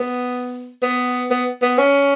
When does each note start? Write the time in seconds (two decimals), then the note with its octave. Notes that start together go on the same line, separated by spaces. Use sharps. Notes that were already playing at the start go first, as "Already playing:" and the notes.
Already playing: B3
0.82 B3
1.31 B3
1.62 B3
1.78 C#4